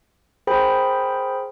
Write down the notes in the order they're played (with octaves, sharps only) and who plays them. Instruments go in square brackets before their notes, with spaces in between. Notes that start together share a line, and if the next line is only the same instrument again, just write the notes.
[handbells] G#4 A#4 C5 G5 B5